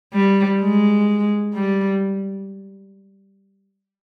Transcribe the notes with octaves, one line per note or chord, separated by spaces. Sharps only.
G3
G#3
G3